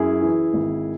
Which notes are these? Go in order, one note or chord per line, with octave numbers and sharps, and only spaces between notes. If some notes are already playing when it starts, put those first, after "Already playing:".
Already playing: F#2 E4 G#4
E3
G#1